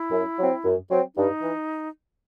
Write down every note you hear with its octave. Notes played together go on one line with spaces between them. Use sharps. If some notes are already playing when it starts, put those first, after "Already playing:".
Already playing: E4
F#2
F#3 C4
F#2
F#3 C4
G2 D#4
E3